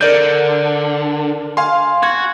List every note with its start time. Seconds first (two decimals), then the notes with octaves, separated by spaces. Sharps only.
0.01 D3 A#4 D5 G6
1.57 F5 G#5 C6
2.03 F#4 G#6